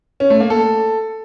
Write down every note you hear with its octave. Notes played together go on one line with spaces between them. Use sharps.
C#4
A3
A#3
A4